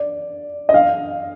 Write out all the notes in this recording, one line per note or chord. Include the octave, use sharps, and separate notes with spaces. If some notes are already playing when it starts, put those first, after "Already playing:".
Already playing: D5
D#5
F5